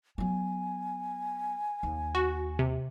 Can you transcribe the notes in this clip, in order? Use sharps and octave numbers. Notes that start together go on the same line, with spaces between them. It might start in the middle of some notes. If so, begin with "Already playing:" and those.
F#3 B3 G#5
D#2
F#4
C3